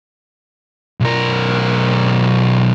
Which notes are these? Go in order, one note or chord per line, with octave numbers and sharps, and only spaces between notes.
B1 A#4